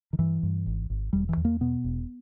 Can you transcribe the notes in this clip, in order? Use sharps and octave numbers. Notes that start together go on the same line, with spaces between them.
D#3
G2 E3
G2
G#1
G#1
E1 G3
E3
E2
A#3
B2 B3
E1